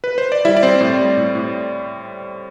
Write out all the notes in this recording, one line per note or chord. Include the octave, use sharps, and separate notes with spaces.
B4
C5
D5
G3 E4 E5
D5
G3 C4 C5
A2
G3
A2
A2